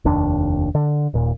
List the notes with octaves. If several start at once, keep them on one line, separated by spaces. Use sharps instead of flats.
F1 D#2 D4
D3
D#1 A#2